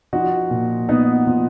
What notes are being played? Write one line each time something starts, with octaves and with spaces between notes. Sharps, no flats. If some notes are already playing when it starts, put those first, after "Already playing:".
F3 D#4 F#4
A#2
A#2 B3 D#4
F3